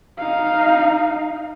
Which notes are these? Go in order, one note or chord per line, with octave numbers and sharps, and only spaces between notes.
D#4 F5